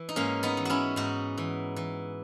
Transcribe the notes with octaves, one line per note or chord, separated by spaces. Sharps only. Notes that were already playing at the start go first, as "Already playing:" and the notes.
Already playing: E3
D#4
G#2 A#3 C#4
B3 D#4
E3
C#4 E4 F#4
G#2 D#4 F#4
E3
E3